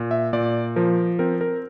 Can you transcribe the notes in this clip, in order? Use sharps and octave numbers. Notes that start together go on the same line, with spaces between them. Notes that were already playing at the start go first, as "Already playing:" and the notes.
Already playing: A#2
E5
A#2 D5
F3 A#4
C4 A#4
A#4